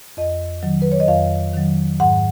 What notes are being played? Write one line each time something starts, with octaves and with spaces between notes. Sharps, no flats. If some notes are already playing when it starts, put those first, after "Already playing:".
F2 D#5
D#3 F#3
B4
C#5
D#5
F2 F5
D#3 F#3
G#2 F#5